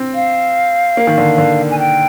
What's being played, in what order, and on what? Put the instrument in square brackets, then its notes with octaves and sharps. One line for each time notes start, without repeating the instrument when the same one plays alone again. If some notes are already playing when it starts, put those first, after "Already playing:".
Already playing: [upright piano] C4
[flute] F5
[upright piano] A#3
D#3
D3
D3
[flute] G#5
G5